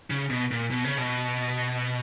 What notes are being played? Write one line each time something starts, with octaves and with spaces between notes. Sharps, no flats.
C#3
B2
A#2
B2
C#3
B2